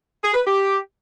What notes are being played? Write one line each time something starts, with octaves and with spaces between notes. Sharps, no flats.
G#4
B4
G4